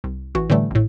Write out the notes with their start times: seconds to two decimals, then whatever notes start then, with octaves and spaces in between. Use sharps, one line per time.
0.04 C2
0.35 A1 E3 F#4
0.49 A2 D3 E3 G3 A3
0.71 A1 A2